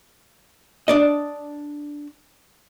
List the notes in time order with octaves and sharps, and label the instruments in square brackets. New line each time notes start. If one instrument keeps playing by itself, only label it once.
[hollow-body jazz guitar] D4 D5 D#5